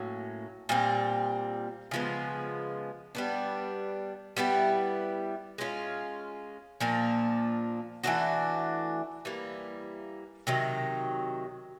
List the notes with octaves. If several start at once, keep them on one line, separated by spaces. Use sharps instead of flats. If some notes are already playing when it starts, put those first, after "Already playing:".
Already playing: A2 F#3 A#3 C#4
A#2 G3 C4
C#3 F3 G#3 B3
G3 B3 D4
G3 B3 E4 G4
G#3 C#4 F4
A#2 F3 A#3 D4
E3 A3 D4 F#4
E3 G3 A#3
C3 D#3 F#3